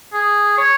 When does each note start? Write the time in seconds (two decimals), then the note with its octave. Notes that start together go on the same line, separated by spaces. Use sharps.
0.13 G#4
0.58 C#5